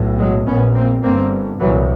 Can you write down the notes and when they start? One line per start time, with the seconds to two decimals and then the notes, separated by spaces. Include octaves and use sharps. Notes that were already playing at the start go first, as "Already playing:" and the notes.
Already playing: B1 A2
0.18 F#3 G#3
0.46 A#1 A#2 B3 C#4
0.74 A#3 C4
1.03 G1 G2 A#3 C4
1.59 C2 A#2 E3 F#3